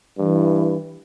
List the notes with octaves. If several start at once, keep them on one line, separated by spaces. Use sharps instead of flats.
G2 E3